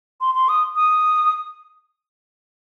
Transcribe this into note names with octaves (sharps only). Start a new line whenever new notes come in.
C6
C6
D#6
D#6